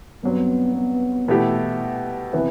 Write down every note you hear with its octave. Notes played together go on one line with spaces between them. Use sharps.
G2 F#3 B3 C4
B3
B2 E3 A3 E4 G4
C3 E3 B3